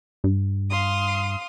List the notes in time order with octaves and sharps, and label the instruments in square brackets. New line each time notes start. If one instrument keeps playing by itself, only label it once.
[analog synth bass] G2
[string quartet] F5 C6 D#6